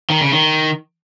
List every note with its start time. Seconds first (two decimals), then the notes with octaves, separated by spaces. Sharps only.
0.10 D#3
0.21 C#3
0.32 D#3